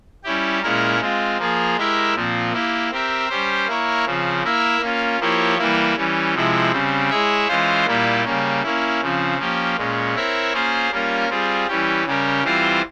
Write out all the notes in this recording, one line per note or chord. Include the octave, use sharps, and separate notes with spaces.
G3 C#4 E4 G4
A#2 G#3 C#4 E4 A#4
G#3 C4 F4
F3 A#3 F4 G#4
G#3 E4 G4 A#4 E5
A#2 F3 C4
A#3 E4 G4
C4 G4 A#4 E5
G3 C#4 G4 C5
A#3 E4 A#4 C#5
C#3 F3 C4
A#3 E4 A#4 E5
A#3 C#4 F4
F3 A#3 E4 G4 C#5
E3 G3 A#3 E4
E3 G3 C#4
C3 F3 G#3 E4
C#3 G3 C4
G#3 E4 G#4 C#5 E5
E3 G#3 C#4 F4 C5
A#2 G3 A#3 E4 G4
C#3 G3 A#3 C#4
A#3 C#4 E4
C#3 F3 C4
F3 A#3 C#4 G4
A#2 G#3 C#4
C4 E4 A#4 C#5 E5
A#3 C#4 F4 G#4 C5
G3 A#3 C#4 F4 A#4
G3 C4 F4 G#4
E3 G3 C#4 G4
C#3 G3 C#4 G4 A#4
E3 G3 C4 F4 C5